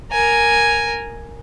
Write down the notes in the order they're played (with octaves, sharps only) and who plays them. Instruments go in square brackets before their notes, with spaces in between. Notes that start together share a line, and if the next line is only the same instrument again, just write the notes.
[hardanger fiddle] A#4 G#5